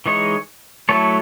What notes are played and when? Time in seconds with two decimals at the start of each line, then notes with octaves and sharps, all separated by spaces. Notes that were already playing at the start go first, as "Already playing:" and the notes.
0.06 E3 G#3 D#4 G#4 C#5
0.89 F#3 A3 E4 A4 C#5